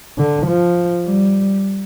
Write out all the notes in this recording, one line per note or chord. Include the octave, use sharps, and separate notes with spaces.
D3
F3
G3